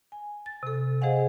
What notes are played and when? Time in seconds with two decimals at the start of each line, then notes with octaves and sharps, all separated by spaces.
0.12 G#5
0.46 A6
0.63 C3 A4
1.01 G#4 C5 D#5 F5 F#5 G#5